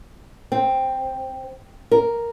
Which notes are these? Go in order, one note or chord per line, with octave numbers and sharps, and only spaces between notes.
C4
A#4